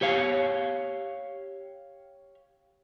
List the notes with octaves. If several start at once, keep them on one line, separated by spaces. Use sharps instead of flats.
G4 C#5 F5